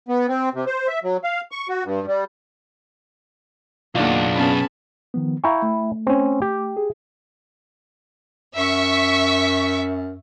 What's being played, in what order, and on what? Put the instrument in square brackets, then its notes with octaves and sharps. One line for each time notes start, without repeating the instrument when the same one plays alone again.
[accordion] B3
C4
C3
C5
E5
F#3
F5
C#6
F#4
G2
G3
[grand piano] F#1 D4 F4 [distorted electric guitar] B1 [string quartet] D#3 A#3 F#5
[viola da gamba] B3 C#4 [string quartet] G#4 A5 B5
[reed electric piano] D#3 F3 B3
[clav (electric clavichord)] E4 G5 [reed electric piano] F5 A#5 C#6
[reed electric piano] A3
[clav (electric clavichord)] C4 C#4
G4
[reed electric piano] G#4
[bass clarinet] F#2 [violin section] E5 C#6 B6